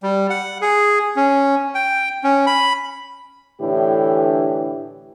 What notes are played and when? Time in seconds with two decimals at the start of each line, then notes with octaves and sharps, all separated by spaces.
0.03 G3
0.30 F#5
0.62 G#4
1.16 C#4
1.75 G5
2.24 C#4
2.47 B5
3.61 A2 D3 E3 E4 G4